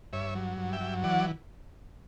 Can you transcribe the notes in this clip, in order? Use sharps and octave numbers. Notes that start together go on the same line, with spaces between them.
G2 C#5 E5
F#3
G2
E5 G5
F#3
E3 D5 F#5